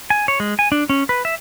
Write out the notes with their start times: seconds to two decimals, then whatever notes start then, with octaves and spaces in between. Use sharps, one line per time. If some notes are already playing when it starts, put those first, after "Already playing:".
0.10 G#5
0.28 C#5
0.40 G#3
0.59 G#5
0.72 D4
0.90 C#4
1.09 B4
1.25 E5